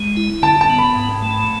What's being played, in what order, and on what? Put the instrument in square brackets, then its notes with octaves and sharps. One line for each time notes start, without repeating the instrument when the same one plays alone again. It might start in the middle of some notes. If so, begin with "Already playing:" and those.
Already playing: [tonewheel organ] G#3
E4
[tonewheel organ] D3 [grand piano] A5
[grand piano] A5
[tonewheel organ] B3
[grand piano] B5
[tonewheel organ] G#2
A3